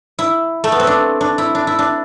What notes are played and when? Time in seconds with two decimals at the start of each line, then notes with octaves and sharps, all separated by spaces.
0.19 E4
0.64 A3
0.72 B3
0.80 C4
0.87 D4
1.21 D4
1.38 E4
1.55 D4
1.67 E4
1.79 D4